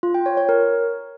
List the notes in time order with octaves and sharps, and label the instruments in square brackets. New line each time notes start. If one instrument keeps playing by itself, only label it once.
[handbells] F4
G5
C#5
C#5
A#4